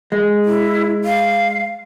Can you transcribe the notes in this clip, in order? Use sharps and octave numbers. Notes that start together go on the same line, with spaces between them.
G#3
E4
F5